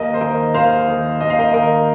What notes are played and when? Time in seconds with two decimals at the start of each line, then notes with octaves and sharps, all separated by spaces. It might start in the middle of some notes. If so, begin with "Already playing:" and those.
Already playing: D#2 A#4 D#5
0.14 C5
0.21 D#3 A#4 D#5
0.54 D#2 C5 F5
0.88 D#3
1.21 D#2 D#5
1.30 F5
1.39 A#4 D#5
1.54 D#3 A#4 D#5